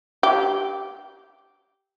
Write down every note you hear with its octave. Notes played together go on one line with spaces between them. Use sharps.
G4